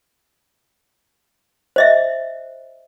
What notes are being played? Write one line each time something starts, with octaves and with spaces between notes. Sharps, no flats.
C5 D#5 E5